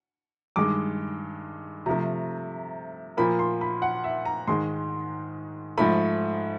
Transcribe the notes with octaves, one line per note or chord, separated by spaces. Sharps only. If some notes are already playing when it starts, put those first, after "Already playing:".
G2 D#3 G#3 D6
C3 F3 A3 A#5
A#2 F3 A#3 B5
C6
B5
F#5
E5
A#5
G#2 D#3 G#3 C6
G#2 F3 A3 B5